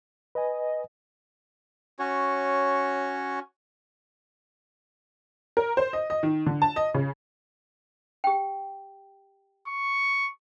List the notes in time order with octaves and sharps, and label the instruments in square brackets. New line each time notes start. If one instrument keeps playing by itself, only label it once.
[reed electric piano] B4 G#5 [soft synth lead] D#5
[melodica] C#4 F#4 C#5
[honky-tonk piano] A#4
C5
D#5
D#5
D#3
D3
A5
D#5
C#3
[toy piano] G4 G5
[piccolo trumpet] C#6